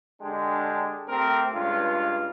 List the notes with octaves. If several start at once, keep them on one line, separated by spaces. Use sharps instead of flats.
D3 G#3 D4 G4
A3 C4 G4 A#4
C#2 G2 F4